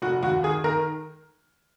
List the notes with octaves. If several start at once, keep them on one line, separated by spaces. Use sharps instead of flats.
F1 F#4
D#2 F#4
D#3 G#4
D#3 A#4